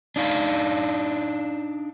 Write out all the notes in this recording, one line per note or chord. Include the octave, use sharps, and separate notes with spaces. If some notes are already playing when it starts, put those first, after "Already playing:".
D4 D#4 F5